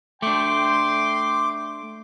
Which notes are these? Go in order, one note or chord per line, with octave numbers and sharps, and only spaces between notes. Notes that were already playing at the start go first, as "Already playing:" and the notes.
A3 D4 G5 C6 D6